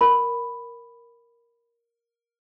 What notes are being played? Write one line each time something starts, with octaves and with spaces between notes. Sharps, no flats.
A#4 B5